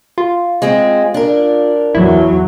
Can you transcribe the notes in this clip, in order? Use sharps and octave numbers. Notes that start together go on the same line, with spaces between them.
F4
G#3 C4 G#4
D4 A#4
E2 F#3 E4